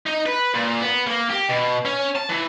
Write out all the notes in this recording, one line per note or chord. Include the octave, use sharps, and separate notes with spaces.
D#4
B4
A#2
B3
A#3
G4
B2
C#4
A5
E3